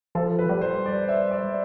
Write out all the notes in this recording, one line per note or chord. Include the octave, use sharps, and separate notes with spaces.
F3 A4
B4
G3
C5
D5
E5
D5